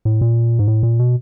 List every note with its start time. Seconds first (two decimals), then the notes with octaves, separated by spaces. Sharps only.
0.05 A2
0.21 A#2
0.59 G#2
0.68 A2
0.83 A#2
0.99 B2